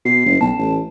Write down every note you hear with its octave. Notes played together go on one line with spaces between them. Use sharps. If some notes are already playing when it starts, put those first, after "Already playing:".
B2 C7
F#1
B1 A5
A1